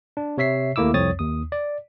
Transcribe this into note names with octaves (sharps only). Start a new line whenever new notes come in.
D4
C3 C#5 E5 B6 C7
D#2 A3 A#3 E4 D6 E6
C2 F2 C4 C#5 D#6 A6
D#2 D#6
D5